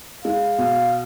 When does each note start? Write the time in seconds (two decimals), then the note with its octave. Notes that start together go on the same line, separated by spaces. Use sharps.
0.24 G#3 F5
0.58 B2